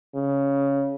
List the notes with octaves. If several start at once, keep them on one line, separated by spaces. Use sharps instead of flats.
C#3